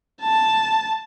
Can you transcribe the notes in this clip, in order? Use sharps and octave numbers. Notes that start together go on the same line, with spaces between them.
A5